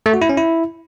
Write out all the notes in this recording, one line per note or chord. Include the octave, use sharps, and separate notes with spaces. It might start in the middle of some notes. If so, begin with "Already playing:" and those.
A3
F#4
E4
C#4
E4